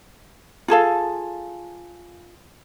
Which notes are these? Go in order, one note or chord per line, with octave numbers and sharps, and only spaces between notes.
F4 G#4 A4 F5